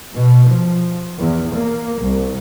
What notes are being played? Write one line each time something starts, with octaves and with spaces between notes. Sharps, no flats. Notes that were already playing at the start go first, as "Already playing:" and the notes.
B2
F3
E2
A#3
C2